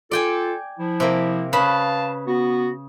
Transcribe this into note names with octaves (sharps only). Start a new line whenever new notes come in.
F4 A4 D5 G5 G#5
F3 E4
C3 A#3
C#3 B4 F5 A5 B5
B3 F#4